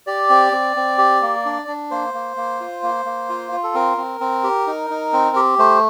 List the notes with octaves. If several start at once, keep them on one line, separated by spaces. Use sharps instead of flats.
G4 D5
C4
C4
C4
G4
A#3
D4
D4
A#3 C5
A#3
A#3
F4
A#3
A#3
F4
F4
A4
C4 A#4
C4
C4
G4
D#4
D#4
C4
G4
A3 C5